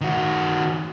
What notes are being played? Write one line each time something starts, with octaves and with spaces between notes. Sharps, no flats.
D#3 F#4